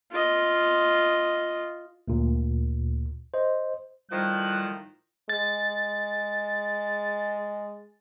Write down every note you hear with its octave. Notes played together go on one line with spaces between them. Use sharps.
F4 D#5
D2 A#2
C5 D#5
A2 D#3 F3 G3 F#6
G#3 A6